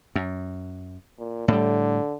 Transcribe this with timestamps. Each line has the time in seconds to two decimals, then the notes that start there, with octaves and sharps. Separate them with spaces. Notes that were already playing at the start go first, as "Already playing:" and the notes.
0.15 F#2
1.19 A#2
1.48 A2 D3 G3